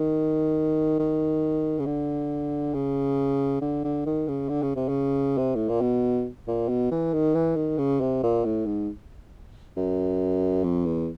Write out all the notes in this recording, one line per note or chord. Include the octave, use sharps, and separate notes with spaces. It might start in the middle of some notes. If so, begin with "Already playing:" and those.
Already playing: D#3
D#3
C#3
D3
C#3
D3
D3
D#3
C#3
D3
C#3
C3
C#3
C3
A2
A#2
B2
A#2
B2
E3
D#3
E3
D#3
C#3
C3
A#2
A2
G#2
F#2
F2
E2